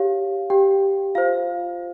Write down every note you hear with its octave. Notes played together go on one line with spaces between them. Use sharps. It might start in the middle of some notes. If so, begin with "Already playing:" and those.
Already playing: G4 C#5 F5
G4 G5
F4 C5 F5